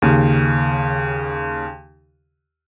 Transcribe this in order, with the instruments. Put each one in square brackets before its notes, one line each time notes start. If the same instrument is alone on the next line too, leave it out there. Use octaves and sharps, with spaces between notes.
[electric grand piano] D#2 C#3